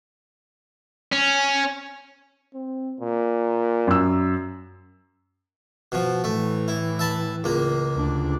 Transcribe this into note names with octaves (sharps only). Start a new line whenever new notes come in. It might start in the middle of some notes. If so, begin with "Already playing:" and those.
C#4
C4
A#2
F#2 E6
B2 F3
A2 E3 A3
E4
E5 A5 B5
C#2 A#3
D2 D4